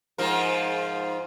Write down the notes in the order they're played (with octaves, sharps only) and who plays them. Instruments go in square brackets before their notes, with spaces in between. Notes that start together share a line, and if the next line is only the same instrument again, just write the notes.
[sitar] G#2 F3 A#4